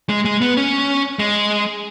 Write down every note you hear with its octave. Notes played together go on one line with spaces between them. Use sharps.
G#3
G#3
B3
C#4
G#3